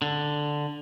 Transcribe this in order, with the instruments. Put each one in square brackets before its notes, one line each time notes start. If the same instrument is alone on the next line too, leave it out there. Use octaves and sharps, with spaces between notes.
[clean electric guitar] D3